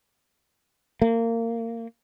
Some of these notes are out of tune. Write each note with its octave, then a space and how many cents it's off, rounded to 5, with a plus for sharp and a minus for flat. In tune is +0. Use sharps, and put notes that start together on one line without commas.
A#3 -25